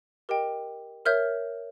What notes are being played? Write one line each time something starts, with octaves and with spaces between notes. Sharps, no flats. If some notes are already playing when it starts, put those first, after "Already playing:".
G4 A#4 D#5 G5
A#4 C#5 E5 F6 G6